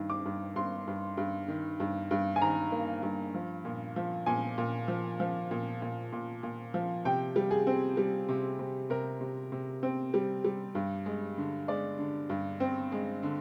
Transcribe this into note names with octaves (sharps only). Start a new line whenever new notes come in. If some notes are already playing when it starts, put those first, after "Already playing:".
Already playing: G2 D#3
D6
G2
G2 C6
G2
G2
D#3
G2
G2
G#5
D#3 A#5
A#3
G2
F3
A#2
F3
A#2 G#5
A#2
F3
F3
A#2
A#2
A#2
A#2
F3
C3 G5
G3
G#4
C4
G3
C3
C3
C3 A#4
C3
C3
C4
G3
G3
G2
G#3
D3
G#3 D5
D3
G2
C4
G#3
D3